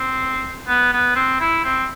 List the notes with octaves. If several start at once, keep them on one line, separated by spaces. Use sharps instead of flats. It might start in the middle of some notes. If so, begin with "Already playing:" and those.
Already playing: C4
B3
B3
C4
E4
C4